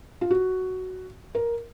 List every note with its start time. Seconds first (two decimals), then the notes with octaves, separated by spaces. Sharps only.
0.21 F4
0.30 F#4
1.35 A#4